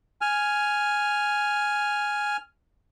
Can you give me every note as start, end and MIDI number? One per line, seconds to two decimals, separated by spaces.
0.21 2.37 80
0.21 2.37 89